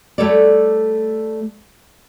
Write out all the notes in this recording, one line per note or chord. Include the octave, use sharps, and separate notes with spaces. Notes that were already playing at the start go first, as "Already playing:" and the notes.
G3 A3 A4 C#5 D5